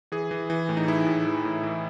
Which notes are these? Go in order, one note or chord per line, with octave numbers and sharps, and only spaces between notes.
E3 G#4
E3
E3
A2
D#4
E3 E4
A2
E3
A2
E3